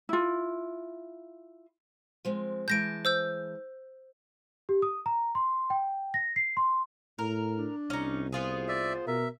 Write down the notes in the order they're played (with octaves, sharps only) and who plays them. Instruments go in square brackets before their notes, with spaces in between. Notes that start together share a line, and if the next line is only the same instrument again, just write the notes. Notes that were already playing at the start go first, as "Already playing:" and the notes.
[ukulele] E4 F4
[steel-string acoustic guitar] F3 G#3 C4
[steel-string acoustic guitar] E3 G#3 A5 [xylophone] G6 A#6 D7
[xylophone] C5 E6 G6
[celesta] G4
D#6
A#5
C6
G5
A#6
C7
C6
[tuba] A2 [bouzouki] A#4
[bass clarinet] D4
[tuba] C2 [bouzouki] C#4 D#4
[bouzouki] B3 F4 G#4 [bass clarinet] C5
[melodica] D5 E5
[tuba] B2 [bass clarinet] A#4 [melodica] E5